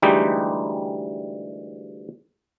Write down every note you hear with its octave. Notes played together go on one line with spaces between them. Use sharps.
D2 E3 G3 G#3 D#4 G4